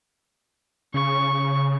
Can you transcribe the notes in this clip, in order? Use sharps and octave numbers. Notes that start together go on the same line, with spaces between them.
C#3 C#6